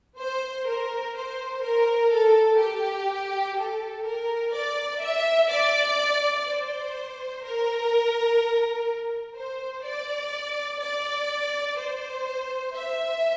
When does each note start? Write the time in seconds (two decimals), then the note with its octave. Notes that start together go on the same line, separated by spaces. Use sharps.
0.19 C5
0.67 A#4
1.16 C5
1.63 A#4
2.12 A4
2.60 G4
3.57 A4
4.06 A#4
4.54 D5
5.02 E5
5.51 D5
6.47 C5
7.44 A#4
9.36 C5
9.85 D5
10.81 D5
11.78 C5
12.75 E5